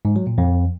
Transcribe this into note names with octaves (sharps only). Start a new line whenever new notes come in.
G#2
F#3
A#2
F2